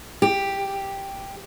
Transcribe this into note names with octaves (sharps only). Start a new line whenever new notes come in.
G4